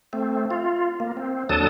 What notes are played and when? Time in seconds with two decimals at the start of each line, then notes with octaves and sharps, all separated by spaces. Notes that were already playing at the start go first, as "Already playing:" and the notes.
0.13 A3 C4
0.51 F4
1.00 A#3
1.17 C4
1.49 D#2 F#3 D4 A4 A5 D#6